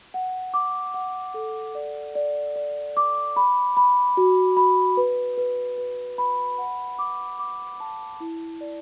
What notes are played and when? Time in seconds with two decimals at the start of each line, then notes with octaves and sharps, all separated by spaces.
0.14 F#5
0.54 D6
0.94 F#5
1.34 A4
1.75 D5
2.15 D5
2.56 D5
2.97 D6
3.36 B5
3.77 B5
4.17 F#4
4.57 B5
4.97 B4
5.38 B4
5.78 B4
6.18 B5
6.58 F#5
6.99 D6
7.39 D6
7.80 A5
8.20 E4
8.61 D5